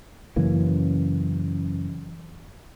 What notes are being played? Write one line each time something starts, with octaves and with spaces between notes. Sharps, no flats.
F#2 C#3 E3 A#3